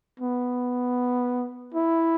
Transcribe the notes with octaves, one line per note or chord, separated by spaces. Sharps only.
B3
E4